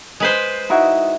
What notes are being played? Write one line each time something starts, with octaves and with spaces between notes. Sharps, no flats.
G#3 B4 C5
D#4 E4 F#4